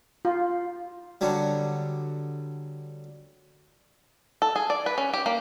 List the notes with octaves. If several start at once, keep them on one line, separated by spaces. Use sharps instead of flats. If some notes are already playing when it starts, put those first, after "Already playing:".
F4
D3 F#3 G3
A4
G#4
D5
B4
C#4
G4
A#3